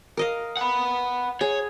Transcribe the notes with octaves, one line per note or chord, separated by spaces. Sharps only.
A#4 D#5 F5
F#5 B5
G#4 C#5